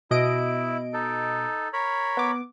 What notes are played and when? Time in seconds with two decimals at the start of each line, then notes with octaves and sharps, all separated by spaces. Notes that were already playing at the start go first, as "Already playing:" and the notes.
0.11 B2 E4 D#5 D7
0.93 D#4 A4
1.73 A#4 C#5 B5
2.17 B3 D6